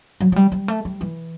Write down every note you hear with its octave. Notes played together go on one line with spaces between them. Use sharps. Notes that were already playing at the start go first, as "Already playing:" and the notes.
F#3
F#3
G3
G3
A3
G3
E3